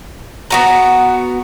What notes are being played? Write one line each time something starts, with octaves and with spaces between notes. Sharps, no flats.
B3 F#4 A#5